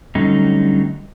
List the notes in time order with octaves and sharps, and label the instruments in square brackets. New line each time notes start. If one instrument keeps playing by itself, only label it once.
[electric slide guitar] D3 F#3 G3 A3 C#4 D#4